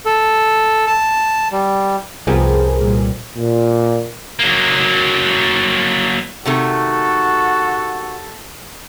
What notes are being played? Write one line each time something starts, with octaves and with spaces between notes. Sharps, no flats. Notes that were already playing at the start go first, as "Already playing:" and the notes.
A4
A5
G3
C2 F2 F3 B3 G4 G#4 A#4
A1 A#2 G3
A#2
F#3 A#3
C3 D#3 A3 F#4 A4